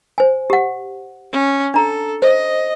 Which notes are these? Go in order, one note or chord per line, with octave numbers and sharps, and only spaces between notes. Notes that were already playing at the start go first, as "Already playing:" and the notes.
C5 G#5
G4 F#5
C#4
D4 A4 A#5
C5 D#5